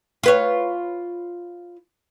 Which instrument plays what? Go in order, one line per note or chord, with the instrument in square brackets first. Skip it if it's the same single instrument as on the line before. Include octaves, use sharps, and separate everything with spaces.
[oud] F4 B4 C#5